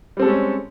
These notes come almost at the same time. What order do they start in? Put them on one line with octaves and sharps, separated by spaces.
G3 C4 A4 G#3 C#4